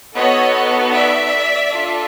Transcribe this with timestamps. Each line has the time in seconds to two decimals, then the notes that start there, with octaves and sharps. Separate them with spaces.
0.15 B3 D#4 F#4 A4 C#5 D#5
0.93 D5 E5
1.72 D4 F4 A4